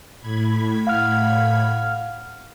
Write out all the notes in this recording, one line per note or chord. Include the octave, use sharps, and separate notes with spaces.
A2 B5 G#6
F5 F#5 F6